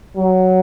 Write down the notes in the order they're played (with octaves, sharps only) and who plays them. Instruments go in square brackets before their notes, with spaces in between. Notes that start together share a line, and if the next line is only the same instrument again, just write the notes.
[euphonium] F#3